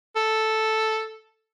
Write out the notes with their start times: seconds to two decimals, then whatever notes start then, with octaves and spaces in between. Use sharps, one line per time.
0.16 A4